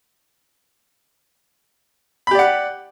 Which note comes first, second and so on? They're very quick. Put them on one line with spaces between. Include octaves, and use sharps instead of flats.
B5 G4 D5 F#5